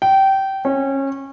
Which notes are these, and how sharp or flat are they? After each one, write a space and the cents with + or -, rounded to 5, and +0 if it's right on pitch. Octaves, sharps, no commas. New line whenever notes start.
G5 -20
C#4 -25